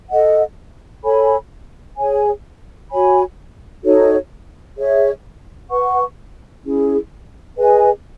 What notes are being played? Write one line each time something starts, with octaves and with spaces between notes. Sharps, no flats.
A4 D#5 F#5
A4 C#5 G#5 B5
G#4 C#5 G#5
F#4 C#5 G#5 B5
D#4 F#4 A4 C#5
G#4 C#5 E5
B4 F#5 C#6
C#4 E4 G#4
G#4 B4 D#5 G#5